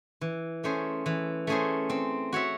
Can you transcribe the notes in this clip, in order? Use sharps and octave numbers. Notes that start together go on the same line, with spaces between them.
E3
A3 C#4 G#4 C5
E3
A3 C#4 G#4 C5
C4
F#4 C#5 E5